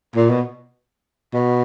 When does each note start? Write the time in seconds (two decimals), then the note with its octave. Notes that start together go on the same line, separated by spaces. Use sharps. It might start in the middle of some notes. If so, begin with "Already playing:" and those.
0.16 A#2
0.29 B2
1.33 B2